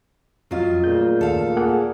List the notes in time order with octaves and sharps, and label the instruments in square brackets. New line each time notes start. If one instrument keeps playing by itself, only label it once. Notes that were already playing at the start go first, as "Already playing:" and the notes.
[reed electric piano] F2 [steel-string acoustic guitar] F#3 F4 [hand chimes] C#4 D#5 F6
[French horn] A#2 [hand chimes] A3 C#4 G#4 [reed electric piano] G6
[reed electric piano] D#2 [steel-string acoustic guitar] A4 F5
[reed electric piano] A#3 G#4 F#5